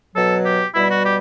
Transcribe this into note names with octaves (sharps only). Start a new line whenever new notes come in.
B2 F#3 A4
G4
B2 G3 E4
F#4
G4